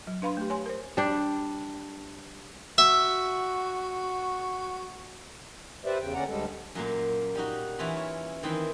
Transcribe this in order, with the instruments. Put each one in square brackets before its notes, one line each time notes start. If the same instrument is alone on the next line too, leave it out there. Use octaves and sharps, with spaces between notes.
[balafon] F#3
D4 B4 F5 B5 C6
A3 G4
C#5 G#5 C6
A#4 C5
[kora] G3 D4
[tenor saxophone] F#4 [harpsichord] E5
[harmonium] G4 B4 C5 D5 E5
E2 C#3 G5
D#2 D3 C#4 D5 F#5 A#5
D2 G3 G#3 A4
[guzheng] F#2 A#2 A#3
G3 D#4 F#4
E3 C#4 E4 F4 B5
C#5
D#3 E3 C4 G5 B5